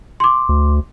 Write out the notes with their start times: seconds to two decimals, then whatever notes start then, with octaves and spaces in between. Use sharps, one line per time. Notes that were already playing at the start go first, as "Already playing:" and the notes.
0.20 C6 D6
0.49 D2